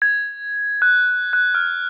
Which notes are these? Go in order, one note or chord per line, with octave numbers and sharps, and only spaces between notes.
G#6
F#6
F#6
F6